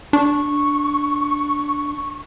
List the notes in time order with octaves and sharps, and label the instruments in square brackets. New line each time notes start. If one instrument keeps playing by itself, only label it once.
[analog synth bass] D4 [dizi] C#6